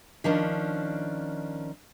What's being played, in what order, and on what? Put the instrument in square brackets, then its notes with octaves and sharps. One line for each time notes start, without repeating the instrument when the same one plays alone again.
[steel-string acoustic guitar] D#3 F3 C#4 D4